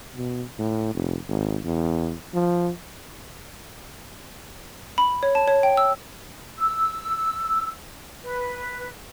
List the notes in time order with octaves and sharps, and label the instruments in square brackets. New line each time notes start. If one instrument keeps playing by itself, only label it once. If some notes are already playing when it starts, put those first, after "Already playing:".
[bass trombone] B2
A2
F1
G#1
E2
F3
[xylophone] B5
C#5
A5
C#5
G5
E6
[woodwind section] E6
B4